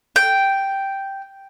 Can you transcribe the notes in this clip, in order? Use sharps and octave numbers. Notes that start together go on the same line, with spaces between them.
G5